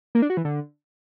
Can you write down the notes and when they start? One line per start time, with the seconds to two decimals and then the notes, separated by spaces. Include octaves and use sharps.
0.15 A#3
0.22 D4
0.30 F#4
0.37 E3
0.45 D3